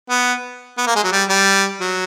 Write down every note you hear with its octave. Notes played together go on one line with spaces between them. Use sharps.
B3
B3
A#3
G#3
F#3
G3
G3
F#3